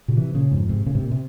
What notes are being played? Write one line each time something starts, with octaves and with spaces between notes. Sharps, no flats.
A#2 C#3
C3 E3
A#2 C#3
F2 G#2
G#2 C3
A#2 C#3
G#2 C3
A#2
C3